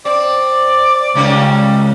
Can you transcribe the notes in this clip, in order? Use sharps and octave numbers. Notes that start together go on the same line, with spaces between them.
C4 D5
C#2 D#3 G3 C#4